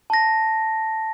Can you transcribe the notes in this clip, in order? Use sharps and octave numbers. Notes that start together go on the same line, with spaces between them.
A5 A#6